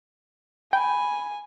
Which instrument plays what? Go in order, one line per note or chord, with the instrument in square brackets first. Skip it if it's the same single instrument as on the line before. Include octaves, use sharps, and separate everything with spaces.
[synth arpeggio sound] G5 [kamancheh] G#5 [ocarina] B5